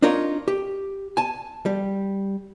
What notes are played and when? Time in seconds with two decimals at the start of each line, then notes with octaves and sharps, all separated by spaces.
0.02 D4 D#4 F4 A#4 C#5
0.48 G4
1.17 G#5 A5
1.66 G3